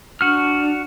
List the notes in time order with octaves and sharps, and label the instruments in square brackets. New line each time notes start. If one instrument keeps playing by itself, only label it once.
[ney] D4 [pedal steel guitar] F#4 F6